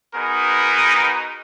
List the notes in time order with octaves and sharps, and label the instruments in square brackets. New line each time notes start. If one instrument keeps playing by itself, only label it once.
[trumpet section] B3 D#4 F#4 G#4 A#4 B4